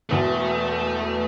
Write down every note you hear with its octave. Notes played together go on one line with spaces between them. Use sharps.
E1 E2 B2 A3